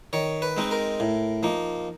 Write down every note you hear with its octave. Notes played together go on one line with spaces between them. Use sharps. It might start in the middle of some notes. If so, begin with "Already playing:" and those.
D#3 C#5
B4
G#3 C4 D#4
A#4
A2
F3 A#3 D#4